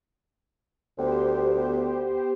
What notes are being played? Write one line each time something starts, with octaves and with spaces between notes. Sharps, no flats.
D2 B3 G4 C5